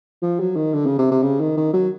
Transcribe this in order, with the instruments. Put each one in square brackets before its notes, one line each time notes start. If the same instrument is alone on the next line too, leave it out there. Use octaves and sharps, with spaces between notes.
[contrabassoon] F3
F#3
D#3
D3
C#3
C3
C3
C#3
D#3
D#3
F#3